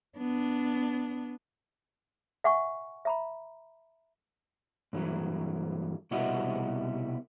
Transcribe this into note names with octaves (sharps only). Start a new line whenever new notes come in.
B3 D4
E5 F#5 G#5 C#6
E5 A#5 B5
G2 E3 F#3
C2 B2 G3 E4 F#4 D#5